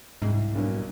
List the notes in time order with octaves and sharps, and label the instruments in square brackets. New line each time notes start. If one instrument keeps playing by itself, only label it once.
[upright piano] C2 [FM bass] G#2
[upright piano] B1 G2 A#3